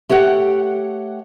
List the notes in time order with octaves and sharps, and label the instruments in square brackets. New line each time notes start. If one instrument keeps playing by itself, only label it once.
[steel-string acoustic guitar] A3 G4 C#5 F#5 G5